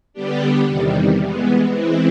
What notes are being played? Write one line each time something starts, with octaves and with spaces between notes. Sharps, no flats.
D3 G3 B3 D4 G4
E2 C3 D#3 G3
E3 G#3 B3
E3 G#3 C4 E4